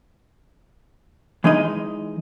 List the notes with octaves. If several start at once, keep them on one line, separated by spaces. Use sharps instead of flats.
E3 G#3 D#4 D#5